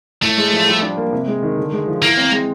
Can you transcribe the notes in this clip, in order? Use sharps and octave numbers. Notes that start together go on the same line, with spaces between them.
A2 A3
G#3
F3
G3
D4
A#3
C3
G#3
D#3
D3
G#3
F3
E3 A#3
C4
G#3